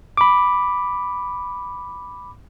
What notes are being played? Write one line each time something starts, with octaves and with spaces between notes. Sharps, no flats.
B5 D6